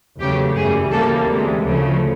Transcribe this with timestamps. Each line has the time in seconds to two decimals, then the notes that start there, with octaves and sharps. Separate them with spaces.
0.20 E2 C#3 F#3 A3 G4
0.56 F#2 C#3 E3 G3 G#4
0.91 D2 C#3 E3 G3 A#3 A4
1.27 D2 C3 E3 G#3
1.63 D2 C#3 F3 A3